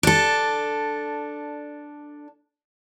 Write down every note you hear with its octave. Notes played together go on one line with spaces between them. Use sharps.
D4 A4